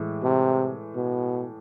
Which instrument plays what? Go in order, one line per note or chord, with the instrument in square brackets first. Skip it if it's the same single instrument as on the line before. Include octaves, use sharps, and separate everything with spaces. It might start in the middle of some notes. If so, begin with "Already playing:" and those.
Already playing: [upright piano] A2 E3 G#3
[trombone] C3
B2